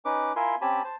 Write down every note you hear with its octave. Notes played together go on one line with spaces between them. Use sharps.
C#4 D#4 B4 D6
E4 F4 A#4 E5 G#5 C6
C4 C#4 G4 G#5 A5 B5
C5 A5